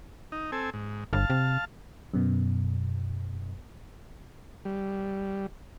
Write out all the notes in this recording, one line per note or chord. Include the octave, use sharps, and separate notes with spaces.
D#4
C4 A4 G#5
G#2
G1 F5 A5
C3
F#2 B2
G3